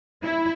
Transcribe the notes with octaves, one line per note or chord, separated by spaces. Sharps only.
E4